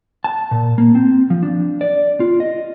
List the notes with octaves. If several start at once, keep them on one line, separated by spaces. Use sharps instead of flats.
A5
A#2
A#3
C4
F3
D4
D5
F4
D#5